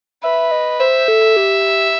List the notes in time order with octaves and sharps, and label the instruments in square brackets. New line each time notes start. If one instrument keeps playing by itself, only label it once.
[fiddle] B4 [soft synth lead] E5
[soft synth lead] D#5
[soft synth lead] C5 [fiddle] E5
[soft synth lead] A4
G4